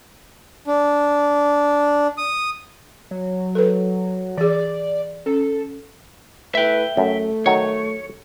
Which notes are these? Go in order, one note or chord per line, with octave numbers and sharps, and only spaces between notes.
D4
D#6
F#3
A4 B4
E3 G#4 D5
C#4 A4
A3 E4 B4 E5 G5
F#2 A3
D#3 F#3 C#5